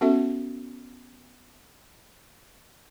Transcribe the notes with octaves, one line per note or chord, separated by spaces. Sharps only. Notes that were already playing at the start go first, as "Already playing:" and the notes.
B3 C#4 F#4 A4 E5